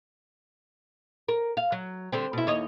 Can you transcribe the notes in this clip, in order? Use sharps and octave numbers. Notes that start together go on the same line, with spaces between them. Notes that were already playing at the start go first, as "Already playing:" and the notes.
A#4
F5
F#3
D3 G3 C4
B2 E4
D#2 C#5 D#5